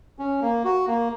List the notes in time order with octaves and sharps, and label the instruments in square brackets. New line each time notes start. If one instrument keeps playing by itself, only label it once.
[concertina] C#4
A#3
F#4
A#3